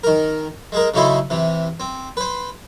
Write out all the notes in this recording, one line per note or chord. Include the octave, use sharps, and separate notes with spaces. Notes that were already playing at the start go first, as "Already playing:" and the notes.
D#3 A#4
G#3 G#4 A#4
C#3 F#3 A3 D#4 E4 C5
C3 E3
C4
B4 C5